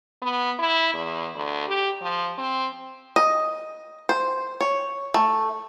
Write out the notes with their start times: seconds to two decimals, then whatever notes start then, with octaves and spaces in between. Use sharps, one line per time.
0.22 B3
0.59 E4
0.94 E2
1.35 D2
1.68 G4
2.02 F3
2.38 C4
3.16 D#5
4.09 C5
4.61 C#5
5.14 A3